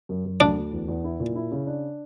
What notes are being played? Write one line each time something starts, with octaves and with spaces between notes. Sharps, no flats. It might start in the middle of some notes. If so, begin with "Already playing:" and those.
F#2
F#2
D2 D4
D2
E2
E2
E4
A#2
E4
C#3
D4